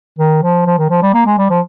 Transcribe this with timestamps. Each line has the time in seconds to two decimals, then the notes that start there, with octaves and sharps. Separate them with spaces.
0.19 D#3
0.43 F3
0.66 F3
0.78 D#3
0.90 F3
1.02 G3
1.14 A#3
1.26 G#3
1.38 G3
1.50 F3